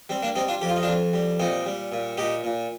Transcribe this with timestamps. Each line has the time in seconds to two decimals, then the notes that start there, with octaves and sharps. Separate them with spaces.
0.09 G3 C4
0.22 A#3 D4
0.35 G3 C4 D#4
0.48 D4 F4
0.61 F2 G4
0.69 F4
0.76 D#4
0.83 D4 F4
0.87 F2
1.13 G3
1.40 A#2 C4 D#4
1.66 G3
1.92 A#2
2.17 A#2 D#4 G4
2.44 A#2